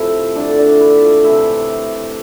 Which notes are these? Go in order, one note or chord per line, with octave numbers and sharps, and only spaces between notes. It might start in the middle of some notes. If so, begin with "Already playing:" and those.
Already playing: C3 F3 A3 E4 E5
D3 A3 D4 D5
D4 D5
E4 E5
F4 F5
C3 E3 A3 E4 E5